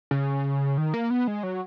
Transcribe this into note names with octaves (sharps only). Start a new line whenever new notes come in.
C#3
D#3
A#3
B3
G#3
F#3